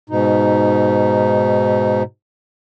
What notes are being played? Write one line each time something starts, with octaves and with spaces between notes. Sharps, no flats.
G#2 B2 D#4